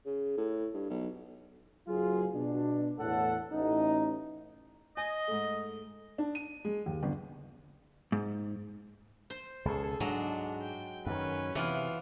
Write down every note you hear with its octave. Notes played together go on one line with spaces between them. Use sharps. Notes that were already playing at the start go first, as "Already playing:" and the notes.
C#3
A2
G2
B1
F#1 F#3 F4 G#4
B2 D4
E2 A2 A4 F#5
A1 D#4
D#5 G#5
G#2 A3
D4
D#7
G#3
D#2
G1
G#2
C5
C#2 B2 G#4 A4
G#2 F#3 G#3 D4
G5
F#2 D#3 C#4 B4
C3 E3 B3 F4